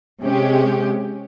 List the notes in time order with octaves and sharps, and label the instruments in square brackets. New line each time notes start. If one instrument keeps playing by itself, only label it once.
[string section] C3 G#3 C#4 G4